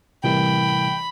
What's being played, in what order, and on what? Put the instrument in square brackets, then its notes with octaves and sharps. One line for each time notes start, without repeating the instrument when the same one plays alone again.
[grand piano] A1 E3 A#4 [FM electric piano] C3 G3 [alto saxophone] G5 [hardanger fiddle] B5